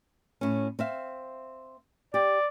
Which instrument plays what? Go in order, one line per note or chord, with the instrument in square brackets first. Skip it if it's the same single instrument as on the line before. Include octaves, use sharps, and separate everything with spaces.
[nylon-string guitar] A2 C#4
C4 E5 F5
[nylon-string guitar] G4 [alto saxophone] D5